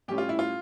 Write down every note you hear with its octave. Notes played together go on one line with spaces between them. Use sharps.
A2 G3 C#4 G4
F4
E4
F4